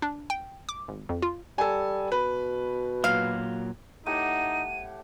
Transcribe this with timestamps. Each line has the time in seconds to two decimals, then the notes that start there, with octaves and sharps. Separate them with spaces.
0.02 D4
0.30 G5
0.69 D6
0.88 G#1
1.09 F2
1.22 F4
1.58 G3 A4 G#5
2.12 B2 B4
3.04 A#2 F#3 F5
4.06 A2 D#4 G4 F#5 D#7